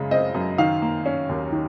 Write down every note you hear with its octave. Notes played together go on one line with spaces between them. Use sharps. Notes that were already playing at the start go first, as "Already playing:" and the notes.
Already playing: F#2 C#3 G#3
C4 D#5
F#2
D#3 F5
A#3
C#4
D#2
D#3